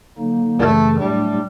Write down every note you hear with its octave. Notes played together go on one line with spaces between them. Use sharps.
D3 F#3 A#3 D#4
F#2 C#3 E3 A3
A2 F#3 G3 A3 D4